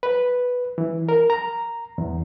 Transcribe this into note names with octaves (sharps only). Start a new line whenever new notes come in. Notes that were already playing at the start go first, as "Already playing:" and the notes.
B4
E3
A#4
A#5
E2